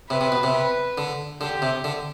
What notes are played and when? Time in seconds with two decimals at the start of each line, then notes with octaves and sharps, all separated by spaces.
0.10 C3 B4
0.21 C3
0.32 B2
0.43 C3
0.53 B4
0.98 D3
1.40 D3 G4
1.62 C3
1.84 D3